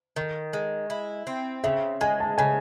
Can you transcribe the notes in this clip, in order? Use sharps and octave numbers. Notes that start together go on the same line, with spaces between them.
D#3
G#3
E4
C4
C#3 E5
G#3 G#5
A5
C#3 G#5